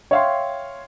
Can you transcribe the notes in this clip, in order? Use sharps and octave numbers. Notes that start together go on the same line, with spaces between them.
C#5 E5 F5 G5 C6